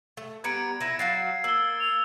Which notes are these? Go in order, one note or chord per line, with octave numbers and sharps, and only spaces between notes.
A3
G3 B3 B4 A#5 G#6 C#7 D7
E4 B4 A#6
F#3 F#4 F5 A6 C7
A#3 E6 G7
F7